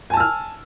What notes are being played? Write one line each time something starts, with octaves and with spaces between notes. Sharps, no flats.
G#5 A5 E6 F6